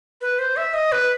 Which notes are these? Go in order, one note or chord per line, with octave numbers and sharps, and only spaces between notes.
B4
C5
E5
D#5
B4